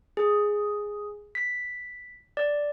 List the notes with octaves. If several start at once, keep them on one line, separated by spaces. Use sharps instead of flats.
G#4
B6
D5